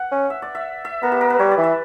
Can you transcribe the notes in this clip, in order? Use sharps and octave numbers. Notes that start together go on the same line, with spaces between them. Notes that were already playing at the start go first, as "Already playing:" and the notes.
Already playing: F#5
C#4
E5
D5
E5
E5
B3 A#4
G4
A#4
B4
G3 C#5
D5
E3
E5